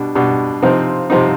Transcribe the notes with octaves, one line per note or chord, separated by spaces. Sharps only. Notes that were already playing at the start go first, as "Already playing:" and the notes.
Already playing: B2 G3 D4
B2 G3 D4
C3 F3 C4 D#4
C3 F3 C4 D#4